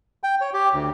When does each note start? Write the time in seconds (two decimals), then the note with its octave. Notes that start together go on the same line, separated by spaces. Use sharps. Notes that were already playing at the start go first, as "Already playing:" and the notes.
0.23 G5
0.41 C#5
0.53 G4
0.74 D2